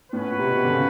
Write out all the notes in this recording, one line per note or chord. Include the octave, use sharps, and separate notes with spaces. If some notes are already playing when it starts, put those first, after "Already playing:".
A2 C#4 F#4 B4
A#2
C3
B2
C3
D3
C#3